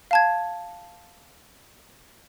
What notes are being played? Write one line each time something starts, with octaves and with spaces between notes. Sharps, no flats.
F5 A5 G#6